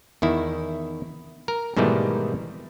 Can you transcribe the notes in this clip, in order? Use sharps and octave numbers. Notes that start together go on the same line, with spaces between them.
E2 D#3 E4
A#4
G#2 B2 D#3 E3 G3 A3